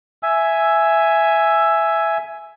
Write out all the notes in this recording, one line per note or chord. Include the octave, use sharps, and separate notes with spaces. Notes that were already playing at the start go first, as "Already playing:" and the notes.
E5 G#5 E6